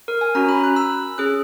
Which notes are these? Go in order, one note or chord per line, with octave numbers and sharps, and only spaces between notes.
A#4
G#5
C#4 F#4 A#5
B5
F#6
E6
C#4 G#4 F#6